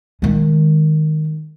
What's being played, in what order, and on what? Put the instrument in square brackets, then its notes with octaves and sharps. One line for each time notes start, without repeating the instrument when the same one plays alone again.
[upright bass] D#3 G#3